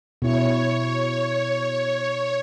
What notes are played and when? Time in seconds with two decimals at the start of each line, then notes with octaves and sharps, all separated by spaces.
0.22 B2 E4 C#5